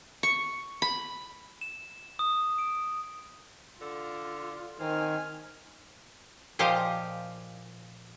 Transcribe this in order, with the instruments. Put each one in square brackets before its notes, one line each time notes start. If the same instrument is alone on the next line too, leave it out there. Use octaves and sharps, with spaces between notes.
[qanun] C#6
B5
[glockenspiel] E7
D#6
D7
[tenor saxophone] D3 [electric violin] F4
[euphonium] D#3 [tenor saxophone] C4 [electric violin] G#5 F6
[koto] A#2 F3 G4 D#5 F5